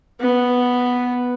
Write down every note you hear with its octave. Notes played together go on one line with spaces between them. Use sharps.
B3